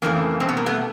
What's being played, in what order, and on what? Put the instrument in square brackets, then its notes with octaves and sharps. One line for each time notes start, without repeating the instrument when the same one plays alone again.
[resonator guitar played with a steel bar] F2 C#3 E3 A3 A#3
B2 G3 C4
B3
A#3
A3 B3